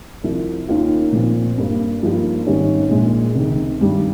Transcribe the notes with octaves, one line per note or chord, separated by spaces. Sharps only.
C2 C3 F3
D#2 D#3 A#3 C#4 F4
A#2 F3 C4
G2 G3 A#3
G2 F3 A#3 D#4 G4
G#1 G#2 G3 C#4 G4
A#1 A#2 G#3
C#2 C3 D#3
G2 D#3 G3